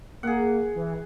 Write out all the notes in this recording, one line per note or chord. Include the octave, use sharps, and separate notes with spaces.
A#3 G#4 F#5
E3